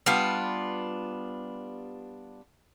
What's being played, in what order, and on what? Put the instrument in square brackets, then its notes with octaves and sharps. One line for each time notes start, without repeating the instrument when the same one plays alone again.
[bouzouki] G3 B3 D4 F4